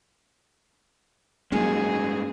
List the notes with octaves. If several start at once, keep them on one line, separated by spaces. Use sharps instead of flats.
G2 F#3 G#3 A#3 C#4 D#4 F#4 G#4